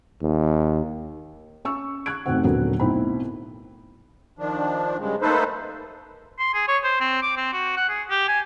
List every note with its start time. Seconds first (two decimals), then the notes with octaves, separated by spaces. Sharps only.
0.22 D#2
1.65 C#4 C#6 E6
2.06 C#6 F#6 G#6 D7
2.26 F1 D#2 B2 A3 C4 F#5
2.44 D#1 D3 F#3 B3 A#4
2.80 B1 A2 C4 E4 B5
4.39 D#3 F3 D4
4.99 G2 C#3 G#3
5.22 A3 A#3 D#4 A4 B4 C5
6.39 C6
6.54 G#4
6.68 C#5
6.84 C5
7.00 C4
7.22 D6
7.37 C4
7.53 F#4
7.77 F#5
7.89 G#4
8.10 G4
8.28 G#5